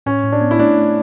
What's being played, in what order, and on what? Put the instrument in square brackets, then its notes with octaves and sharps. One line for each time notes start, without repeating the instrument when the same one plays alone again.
[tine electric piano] A2 [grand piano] C#4
[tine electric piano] A2
[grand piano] D4
[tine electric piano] B3
[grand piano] E4
[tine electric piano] A3 [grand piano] D4
[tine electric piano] A3